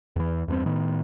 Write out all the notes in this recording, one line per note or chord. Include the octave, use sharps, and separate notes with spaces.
E2 E3
E2 G2 B3 C4
A2 D#3 B3